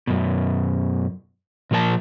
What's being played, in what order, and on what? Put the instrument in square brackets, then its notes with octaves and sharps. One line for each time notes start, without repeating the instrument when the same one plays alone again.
[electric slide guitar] F#2 B2
A#2 F3 A#4 C5 A5